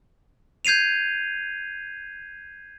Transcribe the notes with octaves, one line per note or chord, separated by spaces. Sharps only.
G6 G#6 C7 D#7 F7